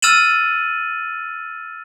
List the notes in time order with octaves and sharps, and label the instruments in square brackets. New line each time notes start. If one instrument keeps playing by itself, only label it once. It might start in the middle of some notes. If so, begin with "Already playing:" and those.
[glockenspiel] E6 F6 A6 D#7 E7 F#7